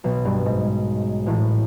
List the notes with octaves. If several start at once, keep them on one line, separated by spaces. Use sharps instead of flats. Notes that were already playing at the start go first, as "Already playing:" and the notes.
B1 B2
G2
G#2
A1 A2